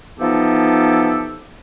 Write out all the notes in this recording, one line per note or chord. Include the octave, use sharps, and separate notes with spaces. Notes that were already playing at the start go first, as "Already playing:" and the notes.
E3 F3 B3 D#4 G4 A4